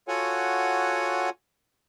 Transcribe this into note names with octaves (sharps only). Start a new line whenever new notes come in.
F4 F#4 A4 C#5 F#5 G#5